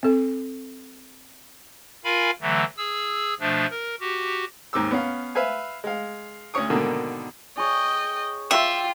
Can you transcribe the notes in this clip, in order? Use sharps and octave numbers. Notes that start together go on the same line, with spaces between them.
C4 A4
F4 A#4 F5 G#5 B5
D3 E3 F#3 A3
G#4 E6
B2 F3 A3 D4
A#4
F#4 G4
D#2 G#2 D6 E6
B3 C#4 F5
B4 E5 F5 G#5
G#3 F5
D2 C#4 C#5 C#6 D#6
G#2 B2 D3 D#3 A#3
G#4 C#5 D#5 G5
F4 E5 G5 D6